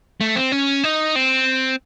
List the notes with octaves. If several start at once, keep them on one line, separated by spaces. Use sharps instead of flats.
A3
C4
C#4
D#4
C4